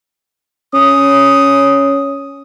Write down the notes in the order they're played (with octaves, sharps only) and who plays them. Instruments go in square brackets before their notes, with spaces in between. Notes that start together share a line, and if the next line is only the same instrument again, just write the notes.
[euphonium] C#4 [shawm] D#6